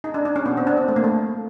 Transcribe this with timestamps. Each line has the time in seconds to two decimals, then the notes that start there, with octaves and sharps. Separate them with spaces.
0.04 D#4
0.14 D4
0.25 D4
0.36 C#4
0.46 B3
0.57 C4
0.67 D4
0.77 C4
0.88 A3
0.96 A#3
1.04 A3